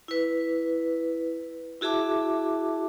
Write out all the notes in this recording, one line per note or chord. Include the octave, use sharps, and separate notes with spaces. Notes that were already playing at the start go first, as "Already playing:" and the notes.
E4 B4
E4 F#4 G#4 E5 A5 D6